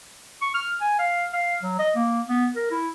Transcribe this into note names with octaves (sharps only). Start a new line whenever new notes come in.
C#6
F6
G#5
F5
F5
F#3
D#5
A#3
B3
A#4
E4